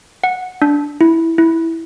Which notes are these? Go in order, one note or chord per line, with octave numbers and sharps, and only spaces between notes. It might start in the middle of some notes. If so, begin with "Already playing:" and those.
F#5
D4
E4
E4